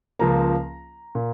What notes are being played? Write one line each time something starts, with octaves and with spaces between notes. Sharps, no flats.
C#2 C#3 F3 A#3 A#5
A#2